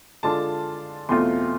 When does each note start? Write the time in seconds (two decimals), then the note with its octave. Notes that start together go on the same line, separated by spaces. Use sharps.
0.23 D3 G#3 D4 F4 A5
1.09 E2 B2 A3 C4 F4 C6